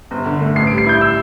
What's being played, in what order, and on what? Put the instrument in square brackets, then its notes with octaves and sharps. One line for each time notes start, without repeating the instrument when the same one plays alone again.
[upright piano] G1
D3
A3
[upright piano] A1 [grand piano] C7
[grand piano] D7
[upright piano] G3
[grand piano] C7
[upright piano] E4 [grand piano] G6
[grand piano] E6